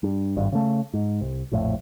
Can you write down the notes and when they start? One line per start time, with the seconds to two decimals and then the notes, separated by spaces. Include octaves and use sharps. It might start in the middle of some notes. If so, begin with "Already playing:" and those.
0.03 G2
0.36 G#1 G2
0.52 C#3 A3
0.94 G#2
1.21 C2
1.52 A#1 F2 A2